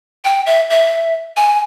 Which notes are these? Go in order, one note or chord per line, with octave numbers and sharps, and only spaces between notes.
G5
E5
E5
G#5